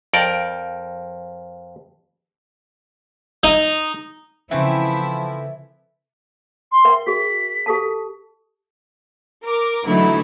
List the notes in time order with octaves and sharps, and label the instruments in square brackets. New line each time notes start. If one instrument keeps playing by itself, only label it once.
[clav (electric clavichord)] F2 A#4 D5 G5
[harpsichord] D#4
[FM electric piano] C#3 E5 [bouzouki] E3 A3 C4 [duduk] F3 [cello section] E4
[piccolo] C6
[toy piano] A#4 E5 G5
[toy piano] F#4 G#4 [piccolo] B6
[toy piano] G4 A4 A5
[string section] A#4 D6
D3 E3 F#3 A3 D#4 E4